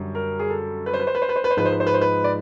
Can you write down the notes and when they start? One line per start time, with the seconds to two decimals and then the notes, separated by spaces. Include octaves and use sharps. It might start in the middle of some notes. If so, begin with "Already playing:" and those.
Already playing: F#2 D3 G3
0.15 A#4
0.39 G#4
0.50 A4
0.86 B4
0.94 C5
1.00 B4
1.07 C5
1.15 B4
1.22 C5
1.29 B4
1.36 C5
1.44 B4
1.50 C5
1.57 G#2 F3 G#3 B4
1.65 C5
1.73 B4
1.80 C5
1.87 B4
1.94 C5
2.01 B4
2.24 D5